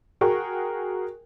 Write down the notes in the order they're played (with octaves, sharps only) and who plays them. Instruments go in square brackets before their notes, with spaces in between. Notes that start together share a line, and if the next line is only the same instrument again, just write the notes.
[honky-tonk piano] F#4 G#4 A#4 G5 C#6